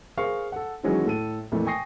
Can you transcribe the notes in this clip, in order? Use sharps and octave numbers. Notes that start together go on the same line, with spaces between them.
G#4 A#4 C5 F5 C#6 F6
A4 F#5
D#3 E3 F#3 G#3 C#4 G#4
A2 A4 D#7
F2 A#2 E3 A3
G5 G#5 C#6 D#6 A#6 C7